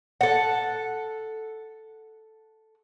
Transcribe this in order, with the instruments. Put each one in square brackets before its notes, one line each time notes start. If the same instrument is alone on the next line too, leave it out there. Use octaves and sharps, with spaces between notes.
[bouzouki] A4 F#5